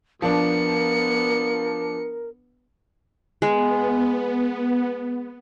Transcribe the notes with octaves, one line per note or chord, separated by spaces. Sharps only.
F3 B3 D4 A#4 C#7
G#3 B3